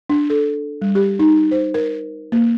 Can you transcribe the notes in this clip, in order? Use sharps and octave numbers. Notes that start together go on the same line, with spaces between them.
D4
A4
G3
G4
D#4
C5
A#4
A#3